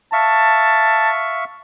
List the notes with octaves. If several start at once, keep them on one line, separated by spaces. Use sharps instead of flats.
E5 F5 A5 C#6